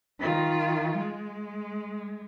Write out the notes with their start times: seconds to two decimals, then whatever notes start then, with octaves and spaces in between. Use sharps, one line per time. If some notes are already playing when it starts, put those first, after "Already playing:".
0.19 D#3 F4
0.97 G#3